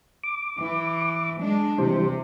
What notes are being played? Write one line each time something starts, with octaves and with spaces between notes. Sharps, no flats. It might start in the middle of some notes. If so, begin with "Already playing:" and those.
D6
E3
G#3 D4
C3 E3 G3 C5